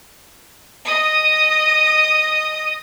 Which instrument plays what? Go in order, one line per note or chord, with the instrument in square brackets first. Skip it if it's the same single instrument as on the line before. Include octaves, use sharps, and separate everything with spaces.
[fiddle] D#5 D#6